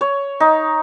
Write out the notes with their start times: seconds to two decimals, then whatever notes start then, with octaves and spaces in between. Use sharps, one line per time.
0.01 C#5
0.40 D#4